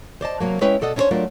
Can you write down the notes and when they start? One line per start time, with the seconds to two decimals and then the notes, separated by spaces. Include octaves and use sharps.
0.21 C5 D5 D#5 A5
0.40 C3 D#3 F#3 A#3
0.61 G#3 C#4 E4 B4 C#5 G5
0.81 B2 A4 D5 D#5 F#5
0.96 C#4 D4 E4 A#4 C5 C#5
1.11 F#3 A3 D4 F4 A#4